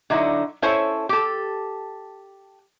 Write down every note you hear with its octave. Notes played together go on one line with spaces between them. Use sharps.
D3 F#3 D#4 E4
C#4 E4 A4 C5 C#5
G4 A4